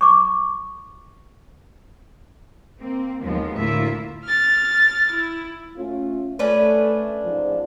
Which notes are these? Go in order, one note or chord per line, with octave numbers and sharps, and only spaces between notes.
C#6 D6
A#3 C4
D#2 F3 G#3 B3
D2 A2 A#3 E4 F4 E5
F6 A6
E4
A3 C#4 F4
A3 C#4 D4 B4
G#2 F3